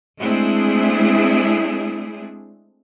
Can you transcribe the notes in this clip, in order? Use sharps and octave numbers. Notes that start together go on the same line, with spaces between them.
G#3 A3 C4 D4 E4 G#4